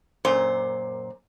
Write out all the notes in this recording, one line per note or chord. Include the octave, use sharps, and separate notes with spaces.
F#2 A#2 C5